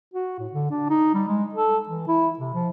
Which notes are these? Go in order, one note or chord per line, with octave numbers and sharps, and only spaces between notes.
F#4
A2
D3
D4
D#4
G3
G#3
A4
E3
E4
C3
F3